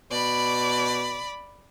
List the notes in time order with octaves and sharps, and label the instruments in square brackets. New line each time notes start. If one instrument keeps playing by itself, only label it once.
[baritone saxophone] B2 [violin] D5 B5